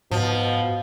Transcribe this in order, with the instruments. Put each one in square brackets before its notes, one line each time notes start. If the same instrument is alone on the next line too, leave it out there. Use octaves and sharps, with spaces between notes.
[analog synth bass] G#2 [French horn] B2 [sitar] F3